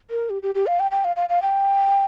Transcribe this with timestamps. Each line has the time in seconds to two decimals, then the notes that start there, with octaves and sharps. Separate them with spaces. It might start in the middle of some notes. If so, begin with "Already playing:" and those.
0.11 A#4
0.30 G4
0.43 G4
0.55 G4
0.67 F5
0.80 G5
0.91 G5
1.05 F5
1.16 F5
1.29 F5
1.42 G5